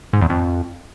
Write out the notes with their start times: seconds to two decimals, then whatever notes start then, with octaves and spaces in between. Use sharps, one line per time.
0.13 G#2
0.22 E2
0.30 F2